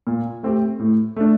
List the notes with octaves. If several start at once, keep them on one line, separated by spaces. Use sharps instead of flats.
A#2
A3 C4 G4
A2
A3 D4